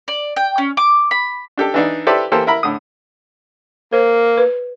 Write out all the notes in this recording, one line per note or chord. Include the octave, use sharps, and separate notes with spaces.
D5
G5
C#4
D6
B5
D4 G4 A4
E3 D4 D#4
E4 G4 A4 B4 C5 D5
E3 A#3 G4 A4 C5
E4 A#4 B5
A2 D3 D#6
A#3 C5
B4